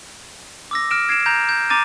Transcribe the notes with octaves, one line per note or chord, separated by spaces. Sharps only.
D6 E6 A#6
F6 A#6 D7 E7
G#6 C7 D7 E7
A#5 G6 A#6
G6
A#5 D6 A6 D#7